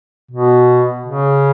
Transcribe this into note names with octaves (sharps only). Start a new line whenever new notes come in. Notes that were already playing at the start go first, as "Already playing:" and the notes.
B2
C#3